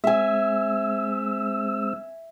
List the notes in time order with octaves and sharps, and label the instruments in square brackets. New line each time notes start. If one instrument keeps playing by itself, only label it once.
[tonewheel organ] G#3 C4 E6 [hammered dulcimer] E5 G#5